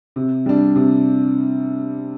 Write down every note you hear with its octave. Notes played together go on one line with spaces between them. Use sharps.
C3
G3 D4
C3